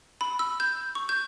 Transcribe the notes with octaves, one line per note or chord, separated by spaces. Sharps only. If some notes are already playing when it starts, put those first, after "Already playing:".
B5
E6
G6
C#6
G6